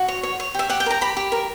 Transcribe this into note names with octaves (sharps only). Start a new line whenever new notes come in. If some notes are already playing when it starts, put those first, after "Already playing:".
Already playing: F#4
C#5
C#5
C#5
G4 E5
G4 F#5
G5
A#4 A#5
G4 B5
G4
A#4